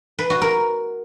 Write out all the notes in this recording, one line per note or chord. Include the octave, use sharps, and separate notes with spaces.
B4
F#4
A#4